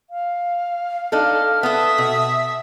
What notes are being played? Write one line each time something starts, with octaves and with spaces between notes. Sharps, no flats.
F5
D4 D#4 A4 F6
B3 A4 E5 D#6
B2